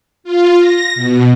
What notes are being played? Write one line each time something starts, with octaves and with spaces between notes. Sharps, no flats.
F4
A#6
B2